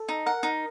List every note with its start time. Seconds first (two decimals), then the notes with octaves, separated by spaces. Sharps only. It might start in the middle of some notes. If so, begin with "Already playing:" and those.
Already playing: A4
0.08 D#4
0.26 A#4 F#5
0.43 D#4